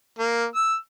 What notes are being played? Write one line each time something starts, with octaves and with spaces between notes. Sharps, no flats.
A#3
E6